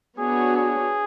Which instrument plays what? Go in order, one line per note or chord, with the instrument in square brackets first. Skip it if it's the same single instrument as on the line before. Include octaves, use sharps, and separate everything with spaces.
[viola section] B3 D4 F#4 C#5 [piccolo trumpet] G#4
[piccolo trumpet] G#4